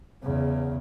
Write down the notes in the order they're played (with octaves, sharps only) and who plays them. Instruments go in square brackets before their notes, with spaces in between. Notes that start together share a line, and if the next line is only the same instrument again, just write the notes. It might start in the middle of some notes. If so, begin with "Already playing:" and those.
[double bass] E2 C#3